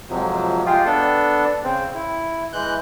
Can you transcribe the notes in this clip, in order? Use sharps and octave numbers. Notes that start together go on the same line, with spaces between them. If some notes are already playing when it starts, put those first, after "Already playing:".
F2 G#2 C3 F3 F#3
G#3 F4 G4 G#4
B3 D4 A4
C#3 C4
E4
E3 G#3 F#6 G6